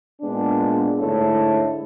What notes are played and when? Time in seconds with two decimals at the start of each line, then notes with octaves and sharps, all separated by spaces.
0.22 A#2 G#3 B3 D4
1.00 G#2 D3 A3 E4 A4 C#5